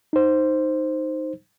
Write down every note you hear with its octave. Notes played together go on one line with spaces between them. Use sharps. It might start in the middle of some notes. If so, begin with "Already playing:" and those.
D#4 C5